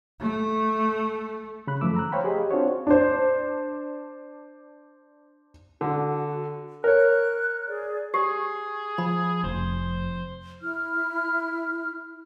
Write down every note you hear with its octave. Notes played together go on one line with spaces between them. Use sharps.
A3
C#3 B5 F#6
F#2 D#3 F3 A3 D6 E6
A#5 F#6
C5 C#5 F5 G5 B5
G4 G#4 D#5
C4 D4 F4 F#4 C5 C#5
D4 C5
D3 F#4
A#4 C#5 F#6
G#4 D5
G4 G#4
F3 B5
F1 C5
E4 F6